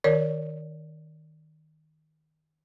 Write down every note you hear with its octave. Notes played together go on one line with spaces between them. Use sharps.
D#3 A#4 C#5 D5